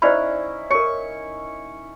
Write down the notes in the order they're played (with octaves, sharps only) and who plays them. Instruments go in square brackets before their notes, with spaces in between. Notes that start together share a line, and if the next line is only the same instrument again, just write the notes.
[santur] C#4 D#4 E4 [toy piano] C5 D5 B5
[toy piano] A#4 C#5 [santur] C#6